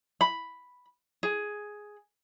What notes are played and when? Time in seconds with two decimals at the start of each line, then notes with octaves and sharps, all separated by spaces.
0.21 B5
1.23 G#4